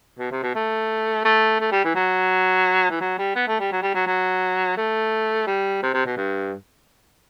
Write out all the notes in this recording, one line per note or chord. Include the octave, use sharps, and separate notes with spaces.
B2
C3
B2
A3
A3
A3
G3
E3
F#3
E3
F#3
G3
B3
A3
G3
F#3
G3
F#3
F#3
A3
G3
C3
C3
B2
G2